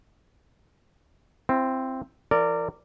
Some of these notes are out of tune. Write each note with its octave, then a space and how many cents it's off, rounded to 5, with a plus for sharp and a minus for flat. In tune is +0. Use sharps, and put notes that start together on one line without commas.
C4 +0 E4 +40
E3 +40 A#4 -30 D5 -5